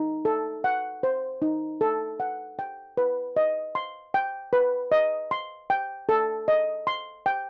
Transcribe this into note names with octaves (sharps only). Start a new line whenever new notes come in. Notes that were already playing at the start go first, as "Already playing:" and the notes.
Already playing: D#4
A4
F#5
C5
D#4
A4
F#5
G5
B4
D#5
C6
G5
B4
D#5
C6
G5
A4
D#5
C6
G5